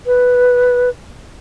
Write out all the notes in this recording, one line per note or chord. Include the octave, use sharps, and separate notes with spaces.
B4